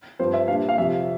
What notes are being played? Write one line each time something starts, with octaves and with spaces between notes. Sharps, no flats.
G2 F3 C4 C5
E5
A#2 G3 D4 F5
F5
F2 C3 F3 E5